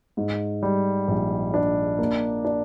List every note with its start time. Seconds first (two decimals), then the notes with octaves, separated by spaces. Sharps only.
0.17 G#2
0.63 G3
1.08 A#1
1.54 D4
1.99 A#3
2.45 D4